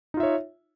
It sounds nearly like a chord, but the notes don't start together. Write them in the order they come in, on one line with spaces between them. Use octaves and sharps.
D#4 F4 E5 C#5